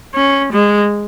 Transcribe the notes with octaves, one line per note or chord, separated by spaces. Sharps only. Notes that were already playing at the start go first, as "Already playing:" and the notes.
C#4
G#3